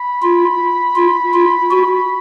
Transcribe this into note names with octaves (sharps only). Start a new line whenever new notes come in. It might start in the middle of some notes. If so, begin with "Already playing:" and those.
Already playing: B5
F4
F4
F4
F#4